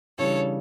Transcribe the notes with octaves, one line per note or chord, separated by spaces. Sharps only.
C#3 E3 G3 D4 A4 C#5